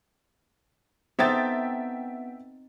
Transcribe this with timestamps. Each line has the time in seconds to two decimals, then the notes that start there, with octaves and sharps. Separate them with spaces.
1.19 B3 C4 D#4 A4 E5 G5 A6